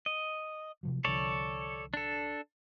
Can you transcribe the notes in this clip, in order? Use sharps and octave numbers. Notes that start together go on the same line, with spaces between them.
D#5
C3 F3 F#3
C2 D3 F3 A4 C#5 D5
D4 A4